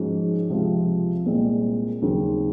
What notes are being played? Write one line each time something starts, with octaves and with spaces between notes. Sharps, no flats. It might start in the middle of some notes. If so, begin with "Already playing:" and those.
Already playing: G#2 F3 G#3 C#4 F#4
C#2 C3 F3 C4 F4
C2 A#2 G#3 C4
D#2 C#3 F#3 C4